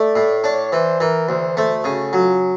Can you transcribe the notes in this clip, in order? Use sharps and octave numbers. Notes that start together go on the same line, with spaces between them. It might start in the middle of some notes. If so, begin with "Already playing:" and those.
Already playing: A3 D5
A2
D4 C#5
E3 C5
E3 A#4
D2 C5
A3 C5
C#3 F#4
F#3 F4